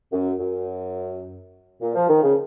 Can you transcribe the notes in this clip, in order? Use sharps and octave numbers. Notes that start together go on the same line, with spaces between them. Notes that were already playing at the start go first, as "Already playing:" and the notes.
F#2
F#2
A#2
F3
D#3
C#3